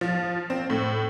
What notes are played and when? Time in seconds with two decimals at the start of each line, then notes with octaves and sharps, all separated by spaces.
0.01 F3
0.50 C4
0.70 A2